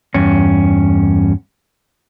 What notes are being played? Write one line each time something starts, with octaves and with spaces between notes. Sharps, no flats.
E2 G2 C#4